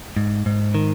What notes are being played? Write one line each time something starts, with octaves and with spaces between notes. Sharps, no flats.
G#2
G#2
D#3